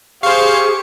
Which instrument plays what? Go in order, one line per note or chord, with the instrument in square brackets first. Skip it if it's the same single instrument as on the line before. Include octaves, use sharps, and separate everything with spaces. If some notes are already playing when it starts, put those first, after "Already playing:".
[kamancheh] G4 [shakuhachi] G#4 [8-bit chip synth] C5 F5 [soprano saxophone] C#6